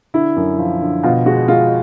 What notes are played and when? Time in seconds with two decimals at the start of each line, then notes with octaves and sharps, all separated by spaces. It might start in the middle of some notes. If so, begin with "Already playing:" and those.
0.14 D3 E4
0.36 F#2
0.58 F3
0.81 D3
1.03 B2 F4
1.26 G#3 F#4
1.48 G#3 F4